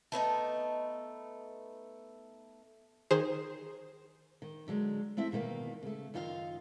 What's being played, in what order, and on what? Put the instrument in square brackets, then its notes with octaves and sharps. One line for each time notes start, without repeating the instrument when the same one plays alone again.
[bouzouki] A3 B3 C#4 D#4
[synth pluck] D#3 G#4 C5
[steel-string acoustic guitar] D#3
D3 F#3 G#3
A3 C4 E4 E5
E2 B2 D#3 G#3 A#3
C#3 A3
F#2 D#3 D#4 F4 G4 F5